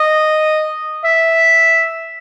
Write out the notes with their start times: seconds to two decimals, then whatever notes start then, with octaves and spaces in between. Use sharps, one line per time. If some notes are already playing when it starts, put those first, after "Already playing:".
Already playing: D#5
1.04 E5